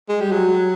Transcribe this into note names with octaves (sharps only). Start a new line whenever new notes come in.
G#3
G3
F#3